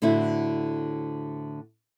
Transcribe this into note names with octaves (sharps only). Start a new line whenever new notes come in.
A2 D3 C4 E4 F#4